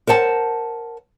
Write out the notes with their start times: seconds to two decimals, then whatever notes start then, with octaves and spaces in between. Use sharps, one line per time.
0.07 A#4 C5 F#5 A5